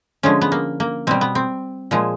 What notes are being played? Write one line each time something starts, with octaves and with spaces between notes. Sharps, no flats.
D3 F3 G#3 C#4
B3
A#3
A#3
B2 G3 C4
B3
C4
A#2 F3 G#3